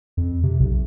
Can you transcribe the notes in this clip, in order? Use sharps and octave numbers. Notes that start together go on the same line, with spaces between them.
F2
C3
B1